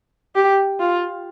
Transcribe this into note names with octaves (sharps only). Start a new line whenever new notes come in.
G4
F4